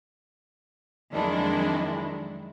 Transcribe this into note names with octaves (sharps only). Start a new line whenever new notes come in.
F2 D#3 F#3 G#3 D4 E4